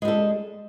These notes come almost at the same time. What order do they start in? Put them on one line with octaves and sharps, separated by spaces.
G#3 G3 A4